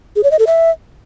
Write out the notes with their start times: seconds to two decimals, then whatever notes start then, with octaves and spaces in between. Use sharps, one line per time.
0.16 G#4
0.23 C#5
0.31 D#5
0.39 A4
0.47 E5